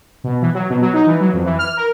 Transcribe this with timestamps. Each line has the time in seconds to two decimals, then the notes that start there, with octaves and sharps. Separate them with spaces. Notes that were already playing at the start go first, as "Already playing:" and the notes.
0.24 B2
0.42 E3
0.54 F#3
0.70 B2
0.81 F#3
0.93 D#4
1.07 E3
1.21 F#3
1.33 F2
1.45 E3
1.59 F6
1.77 A#4